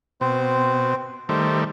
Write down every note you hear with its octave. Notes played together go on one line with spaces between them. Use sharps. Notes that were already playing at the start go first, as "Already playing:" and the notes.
B2 C4 C5
D#3 G3 A3 C5